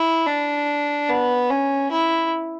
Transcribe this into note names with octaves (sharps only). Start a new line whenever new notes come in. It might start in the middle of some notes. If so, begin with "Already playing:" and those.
Already playing: E4
D4
B3
C#4
E4